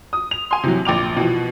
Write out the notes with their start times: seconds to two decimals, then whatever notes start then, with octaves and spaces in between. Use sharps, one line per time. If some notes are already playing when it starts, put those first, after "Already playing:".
0.13 D#6
0.31 F7
0.51 G#5 C6
0.64 C3 E3 F#3
0.85 A#1 G5 D6 F7
1.17 B2 E3 F3